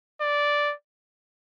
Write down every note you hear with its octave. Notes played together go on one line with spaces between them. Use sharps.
D5